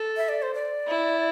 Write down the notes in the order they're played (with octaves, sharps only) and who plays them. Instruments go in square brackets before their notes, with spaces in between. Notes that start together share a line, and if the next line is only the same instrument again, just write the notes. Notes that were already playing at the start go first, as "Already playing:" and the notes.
Already playing: [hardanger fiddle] A4
[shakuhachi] E5
D5
C5
D5
[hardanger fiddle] E4